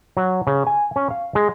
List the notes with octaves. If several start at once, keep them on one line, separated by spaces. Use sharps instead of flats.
F#3
C#3
G#5
C#4
F5
G#3